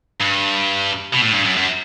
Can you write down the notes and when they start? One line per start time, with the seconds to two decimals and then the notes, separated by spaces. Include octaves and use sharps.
0.21 G2
1.13 B2
1.22 A2
1.32 G2
1.45 F#2
1.57 F#2